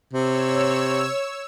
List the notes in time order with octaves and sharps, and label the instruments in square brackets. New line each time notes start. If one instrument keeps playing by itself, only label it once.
[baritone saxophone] C3 [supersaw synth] C#5 E6